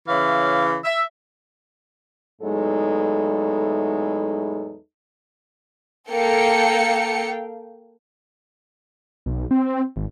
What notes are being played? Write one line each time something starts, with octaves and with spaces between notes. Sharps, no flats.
C#3 E3 E4 C#5 F5
E5
E2 A2 F#3 G#3 D#4 A4
A#3 A4 F5 G5 C#7
B1
C4
G#1